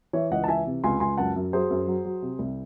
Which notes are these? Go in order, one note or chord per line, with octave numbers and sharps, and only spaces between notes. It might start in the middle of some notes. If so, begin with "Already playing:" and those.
E3 C#5 E5
C#2 D#5 F#5
A5
E3 E5 G#5
C3
C#2 G#5 C6
C#2 G#5 C6
F#2 F#5 A5
F#2
F#3 G#4 C5
F#2
F#3
F#3
C3
C2